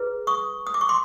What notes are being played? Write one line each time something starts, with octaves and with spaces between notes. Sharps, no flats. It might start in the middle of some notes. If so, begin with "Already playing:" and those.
Already playing: E4 G#4 B4
C#6 D#6
D#6
D6
C#6
C6 D6